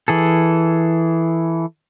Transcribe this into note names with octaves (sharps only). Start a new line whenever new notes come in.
E3 G#4 A4